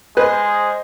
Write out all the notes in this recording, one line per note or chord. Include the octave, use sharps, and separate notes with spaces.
G#3 B4 C5 D#5